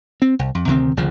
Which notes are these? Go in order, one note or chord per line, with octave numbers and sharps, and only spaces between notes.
C4
C2
F2
D2 C3 D#3 C4
G#1 D2 C#3 F3